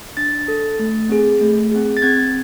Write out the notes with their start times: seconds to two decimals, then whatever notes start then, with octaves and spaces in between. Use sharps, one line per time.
0.17 D4 A6
0.48 A4
0.79 A3
1.09 C4 G#4
1.41 A3
1.72 C4 G#4
1.97 A6
2.02 C4 G#6